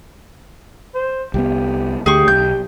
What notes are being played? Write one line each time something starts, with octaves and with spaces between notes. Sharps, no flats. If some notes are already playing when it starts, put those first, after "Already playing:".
C5
C2 F#3 B3 G4
D2 D3 A3 G4 G#4 C#6
B1 G6